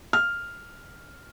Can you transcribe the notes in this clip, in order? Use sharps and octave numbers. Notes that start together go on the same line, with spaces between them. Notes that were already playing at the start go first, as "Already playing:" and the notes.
F6